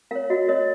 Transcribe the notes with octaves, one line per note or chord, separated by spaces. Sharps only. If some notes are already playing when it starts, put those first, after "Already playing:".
A#4 C#5 F5
F#4 D#5
A#4 C#5 D#5